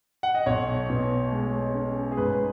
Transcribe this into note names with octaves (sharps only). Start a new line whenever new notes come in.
F#5
D#5
B1 C#5
B2
G#3
C#4
G#4
G#2 B4